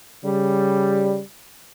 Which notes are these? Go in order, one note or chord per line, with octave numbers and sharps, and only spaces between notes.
C#3 G3